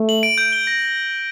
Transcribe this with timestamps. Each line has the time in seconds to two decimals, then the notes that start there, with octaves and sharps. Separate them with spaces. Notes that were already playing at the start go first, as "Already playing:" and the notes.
Already playing: A3
0.09 F#7
0.23 D7
0.38 G6
0.52 G7
0.67 A#6